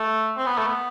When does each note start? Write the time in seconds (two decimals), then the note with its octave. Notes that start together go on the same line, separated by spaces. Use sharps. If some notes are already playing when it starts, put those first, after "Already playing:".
Already playing: A3
0.37 C4
0.46 B3
0.58 A3
0.67 B3